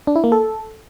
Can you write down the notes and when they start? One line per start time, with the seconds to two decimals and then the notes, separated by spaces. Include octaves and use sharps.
0.07 D4
0.16 E4
0.24 A#3
0.32 A4